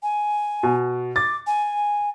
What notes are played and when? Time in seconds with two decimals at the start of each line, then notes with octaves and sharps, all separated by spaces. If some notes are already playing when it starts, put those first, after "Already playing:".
0.03 G#5
0.63 B2
1.16 D6 A6
1.47 G#5